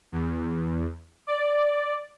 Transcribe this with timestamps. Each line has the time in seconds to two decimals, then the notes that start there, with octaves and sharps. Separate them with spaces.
0.12 E2
1.27 D5